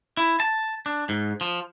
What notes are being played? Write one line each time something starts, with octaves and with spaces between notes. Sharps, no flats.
E4
A5
D4
G#2
F3